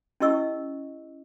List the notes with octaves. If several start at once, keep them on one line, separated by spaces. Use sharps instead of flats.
C#4 E4 G4 D#5 C#6 E6